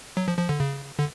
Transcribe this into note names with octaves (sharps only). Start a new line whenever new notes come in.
F#3
F3
F3
D3
C#3
D3